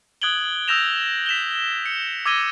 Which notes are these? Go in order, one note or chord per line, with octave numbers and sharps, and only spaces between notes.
D#6 F#6 G#6 D7 F#7 G7
D#6 E6 G6 A#6 E7 F7
B6 E7 F7 G7
C#7
D6 E6 G#6 A#6 D#7 G7